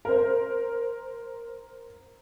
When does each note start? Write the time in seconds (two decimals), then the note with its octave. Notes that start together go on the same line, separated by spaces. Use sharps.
0.05 A#4 C5